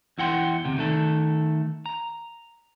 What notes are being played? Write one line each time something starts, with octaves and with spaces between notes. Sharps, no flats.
E2 E4 F#5 G5 C6
D2 C3
D#3 A3 A4
A#5